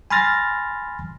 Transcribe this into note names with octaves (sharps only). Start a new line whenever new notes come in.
G#5 B5 C6 F6 A6 A#6